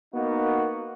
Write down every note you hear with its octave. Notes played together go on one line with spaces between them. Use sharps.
A#3 B3 D#4 F#4